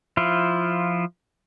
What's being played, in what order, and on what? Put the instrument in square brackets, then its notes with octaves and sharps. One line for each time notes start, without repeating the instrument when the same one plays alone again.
[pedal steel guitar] F3 E4 F4